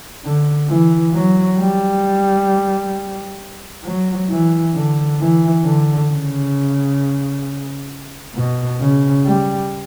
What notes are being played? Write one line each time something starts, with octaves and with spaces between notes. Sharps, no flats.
D3
E3
F#3
G3
F#3
E3
D3
E3
D3
C#3
B2
C#3
G3